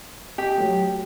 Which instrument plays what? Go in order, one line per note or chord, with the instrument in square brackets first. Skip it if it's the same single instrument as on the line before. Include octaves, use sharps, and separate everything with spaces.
[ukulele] G4 [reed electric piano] D#5
[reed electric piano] F#3 A3